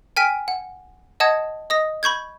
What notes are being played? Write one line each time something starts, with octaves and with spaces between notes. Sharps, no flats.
G5 G#5 F6 B6 D7
F#5
D#5 F#5 A5 D#6 G#6
D#5 D#6 A#6
B5 C#6 G6 G#6